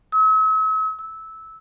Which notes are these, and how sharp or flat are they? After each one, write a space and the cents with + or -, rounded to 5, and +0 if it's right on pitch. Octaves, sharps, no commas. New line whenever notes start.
E6 -45
E6 -15